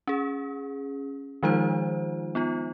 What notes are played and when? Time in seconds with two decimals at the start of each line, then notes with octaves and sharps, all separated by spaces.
0.07 C#4 G#4
1.43 D#3 F3 G#3 D#4 F4 C5
2.35 B3 D#4 F4